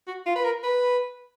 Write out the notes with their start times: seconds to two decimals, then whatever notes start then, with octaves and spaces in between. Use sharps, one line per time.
0.07 F#4
0.26 F4
0.36 B4
0.44 A#4
0.63 B4